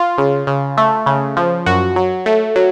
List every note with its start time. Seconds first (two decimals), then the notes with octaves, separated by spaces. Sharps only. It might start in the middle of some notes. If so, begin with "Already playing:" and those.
Already playing: F4
0.18 C#3
0.47 C#3
0.77 A3
1.06 C#3
1.37 F3
1.66 F#2 F#4
1.96 F#3
2.26 A3
2.56 F#3